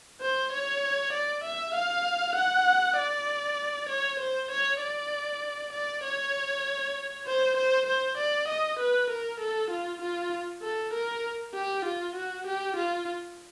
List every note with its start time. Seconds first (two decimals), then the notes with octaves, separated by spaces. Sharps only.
0.21 C5
0.53 C#5
1.13 D5
1.44 E5
1.75 F5
2.36 F#5
2.98 D5
3.90 C#5
4.20 C5
4.51 C#5
4.81 D5
5.73 D5
6.04 C#5
7.27 C5
7.57 C5
7.87 C5
8.18 D5
8.48 D#5
8.80 B4
9.11 A#4
9.40 A4
9.71 F4
10.02 F4
10.63 A4
10.94 A#4
11.54 G4
11.86 F4
12.16 F#4
12.47 G4
12.77 F4